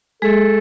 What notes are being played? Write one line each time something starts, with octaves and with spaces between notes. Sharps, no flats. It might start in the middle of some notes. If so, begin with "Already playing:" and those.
G#3 G#4 A4